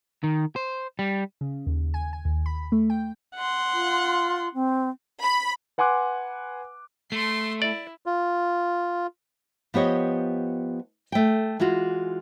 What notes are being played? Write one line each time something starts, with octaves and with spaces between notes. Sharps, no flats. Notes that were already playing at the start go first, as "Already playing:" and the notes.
D#3
C5
G3
C#3
D#2
G#5
G#5
D#2
B5
A3
G5
F#5 C6
F4
C4
B5
B4 F#5 G#5 C6 D6 F#6
A3 C6
E4 D5
F4
F3 B3 G4 C#5 D#5
A3 G5
E3 G#3 F4 F#4